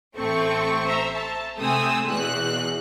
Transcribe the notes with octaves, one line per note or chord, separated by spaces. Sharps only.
A1 A3 C4 C#6
C5 E5 A#5
A5
C3 A3 C4 G#5 D#6 E6
E2 B2 F#6